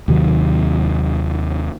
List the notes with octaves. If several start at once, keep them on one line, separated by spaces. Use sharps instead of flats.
D#2 C3 D#3 F#3